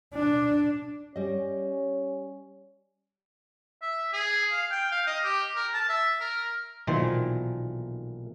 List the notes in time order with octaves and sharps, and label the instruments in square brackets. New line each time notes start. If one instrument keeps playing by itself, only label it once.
[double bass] D4
[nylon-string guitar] G3 D#5 [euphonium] C#4
[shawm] E5
G#4
F5
G5
F5
D#5
G4
A#4
A5
E5
A#4
[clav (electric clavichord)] B1 A#2 D#3 E3 C5